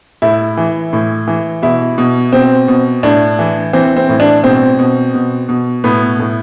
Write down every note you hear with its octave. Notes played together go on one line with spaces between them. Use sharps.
A2 E4
E3
A2
E3
B2 E4
B2
B2 C4
B2
A2 D4
E3
E3 C4
C4
A2
D4
B2 C4
B2
B2
B2
A2 B3
A2